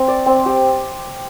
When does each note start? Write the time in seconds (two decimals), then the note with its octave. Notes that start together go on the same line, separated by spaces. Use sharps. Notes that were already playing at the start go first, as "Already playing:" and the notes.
Already playing: C4
0.08 D5
0.26 C4
0.46 G4